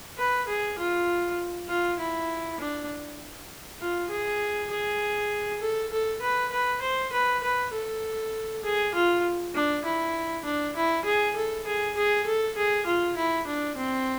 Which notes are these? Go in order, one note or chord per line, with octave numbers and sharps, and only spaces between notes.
B4
G#4
F4
F4
E4
D4
F4
G#4
G#4
A4
A4
B4
B4
C5
B4
B4
A4
G#4
F4
D4
E4
D4
E4
G#4
A4
G#4
G#4
A4
G#4
F4
E4
D4
C4